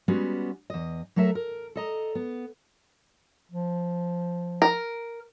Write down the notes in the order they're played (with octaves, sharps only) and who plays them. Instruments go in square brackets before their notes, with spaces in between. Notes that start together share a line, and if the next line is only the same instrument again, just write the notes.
[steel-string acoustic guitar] G3 G#3 B3 C#4 F#4
E2 D#5
F#3 A3 A4 A#4 E5
A#4
A4 D#5 A#5
B3
[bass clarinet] F3
[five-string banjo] A#4